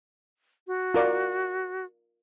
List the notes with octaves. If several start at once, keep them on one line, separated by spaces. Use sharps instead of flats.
F#4
F4 A#4 D5